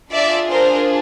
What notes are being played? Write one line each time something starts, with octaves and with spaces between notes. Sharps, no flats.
D4 F4 G#4 D5 E5
A#4 C5